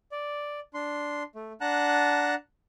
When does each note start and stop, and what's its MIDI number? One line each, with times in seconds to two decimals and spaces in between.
0.12 0.60 74
0.74 1.23 62
0.74 1.23 84
1.35 1.52 57
1.61 2.34 62
1.61 2.34 78
1.61 2.34 81
1.61 2.34 82
1.61 2.34 90